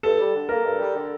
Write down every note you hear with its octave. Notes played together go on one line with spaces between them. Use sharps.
G2 A4
G3
D3
A#3 A#4
G2
G3
D3